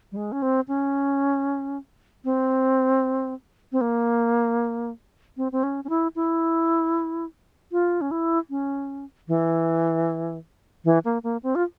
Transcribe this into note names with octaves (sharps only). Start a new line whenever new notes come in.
G3
G#3
C#4
C4
C#4
C4
C4
A#3
C4
C4
C#4
C#4
E4
E4
F4
C#4
E4
C#4
E3
E3
A#3
A#3
C4
F4